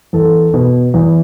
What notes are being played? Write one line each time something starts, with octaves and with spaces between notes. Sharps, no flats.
E2 A4
B2
E2